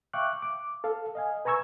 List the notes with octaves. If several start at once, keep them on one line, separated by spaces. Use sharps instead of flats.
E5 F5 G5 C#6 D6 F#6
D6
A4 F5
D#5 F5 G#5
B4 G#5 A#5 C#6 E6 G#6